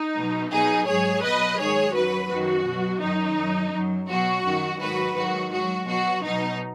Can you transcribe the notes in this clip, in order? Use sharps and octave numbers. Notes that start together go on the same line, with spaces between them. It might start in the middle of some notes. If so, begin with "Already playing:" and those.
Already playing: D#4
B2 F#3
B2 F#3 D#4 G#4
G#2 F#3 G#4 C#5
B2 F#3 B4 D#5
G#2 D#3 F#3 G#4 C#5
F#2 F#3 F#4 B4
F#2 D#3 F#3 F#4
B2
F#3
F#2 D#3 F#3 D#4
F#2 F#3
F#2 F#3
B2 F#3 F#4
F#2 D#3 F#3
G#2 D#3 F#3 F#4 B4
G#2 D#3 F#3 F#4
G#2 F#3 F#4
B2 F#3 F#4
B2 F#3 D#4